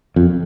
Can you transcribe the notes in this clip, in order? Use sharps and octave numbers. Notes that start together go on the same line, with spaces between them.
F2